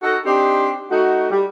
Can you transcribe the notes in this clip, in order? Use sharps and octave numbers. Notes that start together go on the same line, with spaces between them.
D#4 F#4 A4
C4 D4 D#4 G4
A3 D#4 F#4
G3